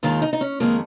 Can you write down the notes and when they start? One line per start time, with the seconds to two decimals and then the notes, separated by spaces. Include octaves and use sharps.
0.03 D#2 D#3 G#3 F4
0.22 D#4
0.33 D#4
0.41 C#4
0.60 F2 D#3 G#3 A#3